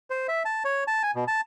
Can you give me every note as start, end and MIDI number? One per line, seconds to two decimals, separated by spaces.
0.10 0.27 72
0.28 0.43 76
0.45 0.63 81
0.65 0.84 73
0.88 1.02 81
1.03 1.11 80
1.15 1.24 47
1.28 1.41 81